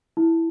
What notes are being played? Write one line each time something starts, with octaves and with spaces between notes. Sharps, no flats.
E4